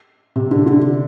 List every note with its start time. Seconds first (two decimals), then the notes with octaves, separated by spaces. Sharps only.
0.36 C3
0.51 D3
0.66 D3